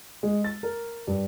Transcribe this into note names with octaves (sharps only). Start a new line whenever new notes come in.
G#3
A6
A#4
G2